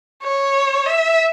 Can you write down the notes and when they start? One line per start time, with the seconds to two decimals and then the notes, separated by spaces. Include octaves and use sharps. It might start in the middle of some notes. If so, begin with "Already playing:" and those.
0.23 C#5
0.87 E5